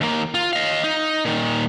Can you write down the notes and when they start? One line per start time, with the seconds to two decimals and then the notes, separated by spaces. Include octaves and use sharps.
0.01 D#2 A#3
0.34 F4
0.53 D#5 F5
0.84 D#4
1.25 A#2 D#3